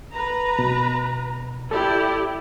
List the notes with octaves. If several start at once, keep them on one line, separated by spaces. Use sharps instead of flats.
B4 A#5
B2
E4 G4 A4 D5